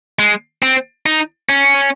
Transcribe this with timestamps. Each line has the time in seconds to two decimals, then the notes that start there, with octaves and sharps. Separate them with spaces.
0.19 G#3
0.62 C4
1.06 D#4
1.49 C#4